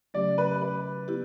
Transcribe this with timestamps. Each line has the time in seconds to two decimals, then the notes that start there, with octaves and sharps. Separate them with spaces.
0.14 C#3 F#3 A3 C#4 G4 D5
0.38 B4
0.62 B4
1.08 B3 E4 G4